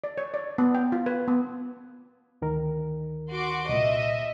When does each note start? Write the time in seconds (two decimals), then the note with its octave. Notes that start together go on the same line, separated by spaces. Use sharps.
0.04 D5
0.18 C#5
0.34 D5
0.58 B3
0.75 G5
0.92 F4
1.06 B4
1.28 B3
2.42 D2 D#3 A#4
3.30 F#4 C6 D6
3.69 C2 A#2 D#5 E5